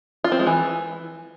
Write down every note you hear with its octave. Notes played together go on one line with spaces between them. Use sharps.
F4
C4
G#3
E3